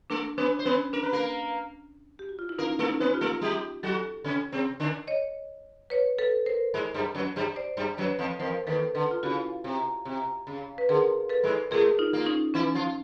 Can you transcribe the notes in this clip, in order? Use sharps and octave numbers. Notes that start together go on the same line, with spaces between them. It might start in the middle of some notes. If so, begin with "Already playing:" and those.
A3 D4 A4
B3 D4 B4
C5
B3 C#4 B4
D4 A#4
B4
A#3 A#4
G4
F#4
F4
E4
A#3 C#4 D#4 A#4
A3 A4
C#4 D#4
B3 B4
F4 G4
A3 A4
G3 G4
F#3 F#4 G4 A4
C#3 C#4
C3 C4
D3 D4
C#5 D#5
B4 C#5
A4 B4
A#4 C5
G#2 G#3
G2 G3
F#2 F#3
G2 G3
C5 D5
G2 G3
F#2 F#3 B4 C#5
F2 F3
F2 F3 A#4 C5
D#2 D#3 A4 B4
D3 A4 B4
F4
C#3 E4 F#4
C3
C3
C#3
B4
D3 G#4 A#4
A4 B4
G#2 G#3
A2 A3 G#4 A#4
D#4 F4
A#2 A#3
C#4 D#4
E3 C#4 E4
F3 F4